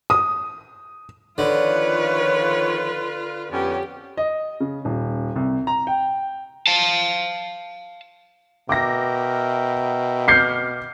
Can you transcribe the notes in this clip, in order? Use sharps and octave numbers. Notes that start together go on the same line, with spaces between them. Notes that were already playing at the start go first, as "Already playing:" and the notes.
D#6
D3 D#3 F3 F4 B4 C#5
F2 B3 C#4 G4
D#5
C#3
D#1
C2
A#5
G5
F5 A5
B2 A#4 E5 G5 D6 A#6
D6 F6 G6 C7 C#7